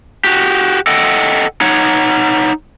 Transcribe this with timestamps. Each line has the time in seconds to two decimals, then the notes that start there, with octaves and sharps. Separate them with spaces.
0.24 F#4 G4
0.87 A4 D#5 F#5 G5
1.61 D#4 C#5 F#5